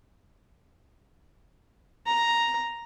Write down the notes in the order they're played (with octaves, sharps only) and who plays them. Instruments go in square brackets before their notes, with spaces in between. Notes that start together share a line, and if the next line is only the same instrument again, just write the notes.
[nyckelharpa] A#5